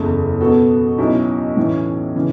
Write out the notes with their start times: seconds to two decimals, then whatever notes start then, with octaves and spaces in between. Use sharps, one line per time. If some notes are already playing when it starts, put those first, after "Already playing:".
Already playing: F#1 E2 C#3 A3
0.41 B2 B3 F#4 A4
0.98 B1 B2 F#3 C#4 E4
1.57 A2 E3 C#4
2.15 C#3 E3